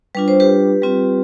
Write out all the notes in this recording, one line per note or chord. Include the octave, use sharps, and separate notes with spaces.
G3 D4 F4 B4
C5
G4 B4
G3 C4 F4